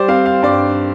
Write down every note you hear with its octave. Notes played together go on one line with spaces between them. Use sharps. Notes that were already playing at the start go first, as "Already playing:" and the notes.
Already playing: G3 C5 D5
C4 F5
F5
G2 D5